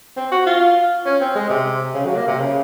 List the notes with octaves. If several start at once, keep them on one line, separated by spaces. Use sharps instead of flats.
C4
F#4
F4
C#4
C4
G#3
C3
C#3
F#3
A#3
C3
C#3